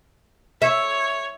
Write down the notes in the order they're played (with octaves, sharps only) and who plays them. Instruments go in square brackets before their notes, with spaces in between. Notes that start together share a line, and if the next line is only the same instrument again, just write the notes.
[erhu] C#5 [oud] E5